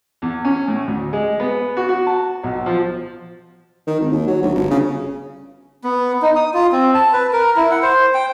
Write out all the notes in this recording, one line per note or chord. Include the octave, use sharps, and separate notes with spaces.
E2
C#4
A2
D2
G#3
B3
F#4
F#4
A5
B1
F3
D#3
G#1
D#2
F#3
D2
G1
C#3
B3
D#4
D#6
F4
C4
A5
B4
A#4
E4
F#5
C5
G5